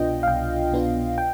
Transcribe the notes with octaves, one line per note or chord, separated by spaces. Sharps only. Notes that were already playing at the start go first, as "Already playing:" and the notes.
Already playing: C2 B2 B3 D4 F4 D#5 G5
F5
C2 G5
B2 B3 D4 F4
G5